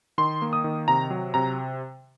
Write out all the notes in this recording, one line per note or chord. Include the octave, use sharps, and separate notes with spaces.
D#3 C6
A#3
D#6
D#3
C3 A#5
F#3
C3 A#5